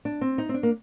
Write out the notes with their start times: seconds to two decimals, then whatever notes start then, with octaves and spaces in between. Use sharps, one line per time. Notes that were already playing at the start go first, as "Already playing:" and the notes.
0.05 D4
0.21 C4
0.38 D#4
0.49 C4
0.54 D4
0.63 A#3